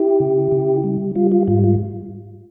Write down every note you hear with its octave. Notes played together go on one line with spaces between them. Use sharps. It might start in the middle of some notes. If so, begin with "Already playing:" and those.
Already playing: E4 G4
C#3
C#3
G3
G3 F4
F4
G#2 F4
F4